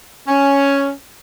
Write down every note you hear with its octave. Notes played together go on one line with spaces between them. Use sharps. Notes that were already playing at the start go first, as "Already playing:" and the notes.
C#4